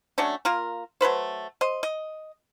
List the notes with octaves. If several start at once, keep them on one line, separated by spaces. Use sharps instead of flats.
F#3 A3 C#4 D4
A#3 F4 A#4
F#3 A3 B4 C5
C5 D#5
D#5